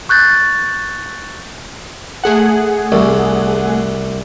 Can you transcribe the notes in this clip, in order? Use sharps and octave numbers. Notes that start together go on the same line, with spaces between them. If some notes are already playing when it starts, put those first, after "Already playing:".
C#6 F#6 G6 A6
A3 G#4 F#5
C2